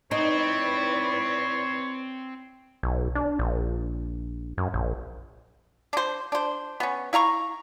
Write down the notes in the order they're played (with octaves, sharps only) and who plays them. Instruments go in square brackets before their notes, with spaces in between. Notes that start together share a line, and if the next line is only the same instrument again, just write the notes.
[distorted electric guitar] C4 [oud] D#4 [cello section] E4 B4 D5 [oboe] C#5
[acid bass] B1
D4
A#1
F#2
A#1
[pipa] D4 C5
D4 C5
B3 C#4
E4 F5 A#5 C#6